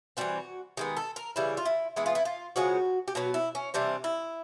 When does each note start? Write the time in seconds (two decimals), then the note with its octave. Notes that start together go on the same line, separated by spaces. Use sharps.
0.17 E3 G3 C4 F#4
0.77 D#3 G#3 B3 G4
0.97 A4
1.16 A#4
1.36 C#3 E3 G3 E4
1.57 F4
1.66 E4
1.96 E3 G#3 B3 E4
2.06 F4
2.15 E4
2.25 F4
2.56 C#3 F3 G#3 C#4 F#4
3.08 G4
3.15 B2 F#3 B3 F#4
3.34 E4
3.55 C#4
3.74 C3 E3 G3 C4 D4
4.04 E4